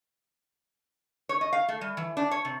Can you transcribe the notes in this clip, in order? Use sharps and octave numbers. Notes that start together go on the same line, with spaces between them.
C#5
D#5
F5
A3
G3
E3
D4
C#5
C3